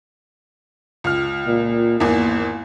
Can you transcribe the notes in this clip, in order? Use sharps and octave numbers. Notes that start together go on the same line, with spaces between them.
C#2 F6
A#2
G#1 E2 A#3